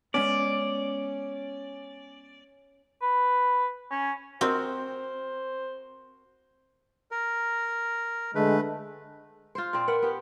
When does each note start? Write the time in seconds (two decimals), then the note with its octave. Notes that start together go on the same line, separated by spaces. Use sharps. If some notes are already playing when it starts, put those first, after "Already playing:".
0.14 G#3 B3 C#4 D5
3.01 B4
3.91 C#4
4.41 C4 F#4 A#4 C5 D#5
7.11 A#4
8.35 D3 G#3 A3 B4
9.55 F4 C5
9.73 A#2 C4
9.88 A#4 B4 F#5
10.02 B3 G4